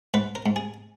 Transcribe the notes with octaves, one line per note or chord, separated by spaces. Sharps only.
G#2 B4
A#4
G#2
G#4